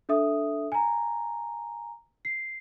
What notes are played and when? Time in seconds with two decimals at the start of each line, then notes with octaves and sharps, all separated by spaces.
0.09 D4 A4 E5 D#6
0.72 G#5 A#5
2.25 C7